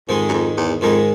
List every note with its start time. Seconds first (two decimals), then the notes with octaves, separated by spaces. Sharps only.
0.08 F2 G#2 D#3 G#3
0.29 F#2
0.33 F2
0.57 E2
0.81 F2 G#2 D#3 G#3